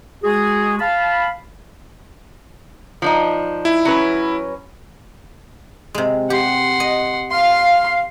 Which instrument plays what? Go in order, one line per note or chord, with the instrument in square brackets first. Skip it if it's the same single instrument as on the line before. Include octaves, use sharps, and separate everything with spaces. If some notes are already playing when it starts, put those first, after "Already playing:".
[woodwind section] G#3 F#4 G#4
F5 A5 B5
[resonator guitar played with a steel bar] F3 D4 D#4
[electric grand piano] E4
[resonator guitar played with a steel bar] F#3 C#4 B4
[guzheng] C3 G#3
[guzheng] G4 [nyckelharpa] F#5 C6
[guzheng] D#5
[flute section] F5 [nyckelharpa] C6